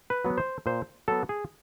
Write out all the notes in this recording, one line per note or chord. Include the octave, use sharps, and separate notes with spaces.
B4
F#3 B3
C5
A#2 C5
F#3 B3 A4
G#4